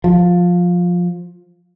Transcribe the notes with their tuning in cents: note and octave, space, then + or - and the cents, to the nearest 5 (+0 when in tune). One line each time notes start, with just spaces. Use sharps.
F3 +15